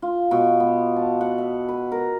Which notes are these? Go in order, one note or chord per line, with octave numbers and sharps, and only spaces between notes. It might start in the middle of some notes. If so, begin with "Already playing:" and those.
F4
B2
B3
A5
F#5
E5
B4
A#4